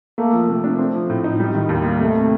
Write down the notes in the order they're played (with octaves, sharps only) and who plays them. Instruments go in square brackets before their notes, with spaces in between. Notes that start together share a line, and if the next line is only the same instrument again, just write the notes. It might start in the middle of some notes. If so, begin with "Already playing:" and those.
[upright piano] A3 [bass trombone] A#3
[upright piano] F3
[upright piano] C3 [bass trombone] A3
[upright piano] D4
C4
F3
A2
D#4
G3
D#3
[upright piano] D#2 [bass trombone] G3
[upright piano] A#3
[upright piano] C3 [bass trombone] A3